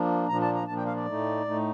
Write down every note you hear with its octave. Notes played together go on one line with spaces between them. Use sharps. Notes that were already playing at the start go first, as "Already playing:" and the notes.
Already playing: F3 A#3 D4
A#2 F3 A#3 D4 A#5
A5
A#5
A#2 F3 A#3 D4 A5
G5
F5
D5
A2 A3 D#4
A2 A3 D#4